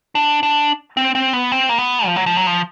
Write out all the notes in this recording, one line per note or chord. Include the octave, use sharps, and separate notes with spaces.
D4
D4
C4
C4
B3
C4
A#3
B3
F3
F#3
F3
F#3
F3